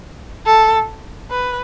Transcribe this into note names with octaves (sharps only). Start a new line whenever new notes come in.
A4
B4